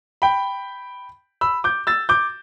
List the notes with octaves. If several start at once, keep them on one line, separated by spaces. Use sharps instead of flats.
G5 B5
B5 E6
D6 G6
E6 A6
D6 G6